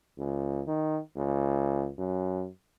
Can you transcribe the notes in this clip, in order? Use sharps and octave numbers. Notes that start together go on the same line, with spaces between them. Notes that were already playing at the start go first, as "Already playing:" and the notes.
C#2
D#3
C#2
F#2